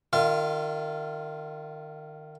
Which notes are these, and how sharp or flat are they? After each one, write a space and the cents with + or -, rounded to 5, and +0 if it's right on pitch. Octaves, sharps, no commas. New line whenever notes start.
D#3 -30 F4 +0 F5 -40